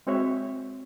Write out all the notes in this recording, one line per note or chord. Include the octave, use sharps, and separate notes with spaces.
G#3 C4 F#4 C5 C#5 E5